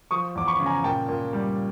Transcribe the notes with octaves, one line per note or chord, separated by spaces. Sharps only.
F3 C#6 D#6
E2 D6
B5 C#6
C#3
G#5 A#5
A#2 G5 A5
A#2
G3